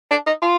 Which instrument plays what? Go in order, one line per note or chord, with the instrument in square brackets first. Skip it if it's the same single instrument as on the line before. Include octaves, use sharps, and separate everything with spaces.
[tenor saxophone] D4
D#4
F4